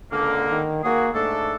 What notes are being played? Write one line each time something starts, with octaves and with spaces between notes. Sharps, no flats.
C#2 D3 A#3
D#3
A#3 F#4 G#4
G#2 A3 D4 A4